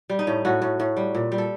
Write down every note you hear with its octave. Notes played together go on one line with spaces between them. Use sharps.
G3
D#4
A2
A2 F#4
A2
A2
G3
A#2
G3
A4